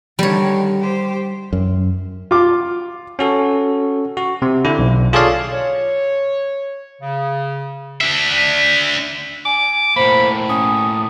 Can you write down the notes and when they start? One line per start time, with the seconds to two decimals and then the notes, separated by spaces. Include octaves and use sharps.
0.19 D3 D#3 G3 C#5
0.80 G4 C5
1.53 F#2
2.31 F4 D6
3.19 C#4 F#4 A4
4.17 F#4
4.42 C3
4.65 D3 E4
4.79 B1
5.13 F4 G#4 A4 C#5 D5 F5
5.52 C#5
7.01 C#3
8.01 D4 E5
9.45 G#5 D6
9.96 A2 A#3 C5 B5
10.49 C#4 D#6